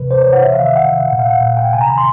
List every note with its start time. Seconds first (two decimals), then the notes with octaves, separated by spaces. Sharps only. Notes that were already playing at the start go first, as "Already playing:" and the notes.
Already playing: C3 E3 B4
0.10 C3 C5
0.21 C#5
0.27 E3
0.33 F#5
0.43 C3 E5
0.54 F5
0.60 D#3 E5
0.76 C3 F#5
0.92 D#3
1.08 A#2 F#5
1.19 F5
1.30 F#5
1.41 A#2 F#5
1.57 G5
1.73 C3 G#5
1.81 A#5
1.89 D#3 B5
1.98 C6